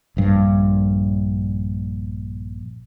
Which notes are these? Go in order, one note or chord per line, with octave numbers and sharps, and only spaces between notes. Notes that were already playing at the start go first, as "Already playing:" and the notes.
A#1 G2